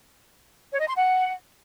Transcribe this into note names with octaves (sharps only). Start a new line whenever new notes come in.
C#5
D#5
C6
F#5